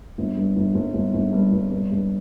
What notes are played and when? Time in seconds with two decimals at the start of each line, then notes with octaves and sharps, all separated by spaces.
0.18 G1
0.37 G2
0.56 G1
0.75 G1
0.94 G1
1.13 G1
1.33 G2
1.52 G1
1.71 G2
1.91 G2